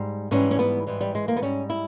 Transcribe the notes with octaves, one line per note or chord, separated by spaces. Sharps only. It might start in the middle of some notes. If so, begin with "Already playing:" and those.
Already playing: G#2 G3
G#2 E3 G3 C#4
C#4
B3
G#2 E3 G3
G3
G#3
A#3
B3
G#2 G3 C#4
E4